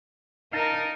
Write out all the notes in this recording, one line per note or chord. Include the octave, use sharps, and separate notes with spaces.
D#4 A#4 F5 A5 A#5